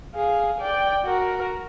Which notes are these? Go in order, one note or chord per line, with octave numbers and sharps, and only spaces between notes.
G#4 F5
D5 G5
F#4 A#4